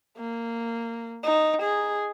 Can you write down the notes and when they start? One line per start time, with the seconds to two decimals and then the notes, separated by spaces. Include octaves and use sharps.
0.17 A#3
1.23 D#4
1.62 G#4